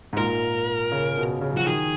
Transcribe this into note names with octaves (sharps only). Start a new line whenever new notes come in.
G#2
A#2 A#4
C#3
B2
C#3
F#3
F3 F#4
D#3 G#4